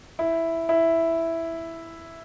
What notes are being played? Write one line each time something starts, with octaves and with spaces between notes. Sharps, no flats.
E4
E4